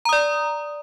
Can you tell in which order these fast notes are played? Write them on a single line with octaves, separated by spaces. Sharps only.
A#5 D#6 D5